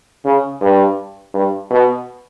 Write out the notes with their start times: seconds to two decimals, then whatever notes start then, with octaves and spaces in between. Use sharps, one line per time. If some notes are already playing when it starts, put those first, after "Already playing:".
0.25 C#3
0.61 G2
1.34 G2
1.71 B2